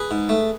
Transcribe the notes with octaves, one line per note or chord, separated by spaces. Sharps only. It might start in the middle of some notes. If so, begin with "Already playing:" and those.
Already playing: G#4 B4
G#2
A3